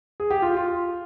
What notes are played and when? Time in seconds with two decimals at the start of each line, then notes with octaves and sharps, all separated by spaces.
0.20 G#4
0.31 G4
0.42 F4
0.57 F4